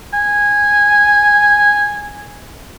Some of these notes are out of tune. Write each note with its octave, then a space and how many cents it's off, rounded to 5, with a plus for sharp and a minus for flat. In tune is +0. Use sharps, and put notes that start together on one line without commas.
G#5 -10